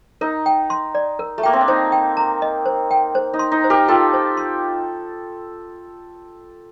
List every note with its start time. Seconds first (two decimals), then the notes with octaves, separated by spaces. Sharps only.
0.21 D#4 A#4
0.46 G5
0.70 C6
0.95 D5
1.19 A#4
1.38 A3
1.43 A#3 G5
1.53 C4
1.61 D4
1.68 D#4 C5
1.92 G5
2.17 A#5
2.42 D#5
2.66 C5
2.91 G5
3.15 C5
3.34 D#4
3.39 C6
3.52 D#4
3.64 C5
3.70 G4 A#4
3.88 F4 A4 G5
4.13 C5
4.37 C6